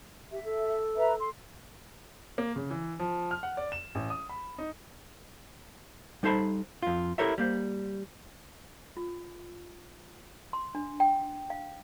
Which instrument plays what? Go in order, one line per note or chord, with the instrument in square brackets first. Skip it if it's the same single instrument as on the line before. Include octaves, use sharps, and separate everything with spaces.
[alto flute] G4 [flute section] E5
[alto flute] A4
[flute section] B4 E5 A#5
C6
[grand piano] A#3
C#3
E3
F3
F6
F#5
D5
E7
A1
D#6
B5
D#4
[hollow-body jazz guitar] G3 D#4 A4 C5 A5 B5
F2 F4
E4 G4 A4 A#4 C#5 E5
G3 A#3 C5
[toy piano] F4
C6
D4
G5
F5